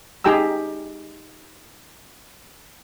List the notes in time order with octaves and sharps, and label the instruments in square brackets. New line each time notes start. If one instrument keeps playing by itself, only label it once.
[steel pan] D#4 G4 G#4 G5 A#5 E6